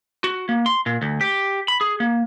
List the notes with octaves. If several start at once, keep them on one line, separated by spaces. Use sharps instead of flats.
F#4
A#3
C6
A#2
D2
G4
B5
G#4
A#3